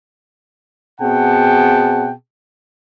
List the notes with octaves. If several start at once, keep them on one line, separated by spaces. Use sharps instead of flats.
B2 C4 G#4 F#5 G5 A5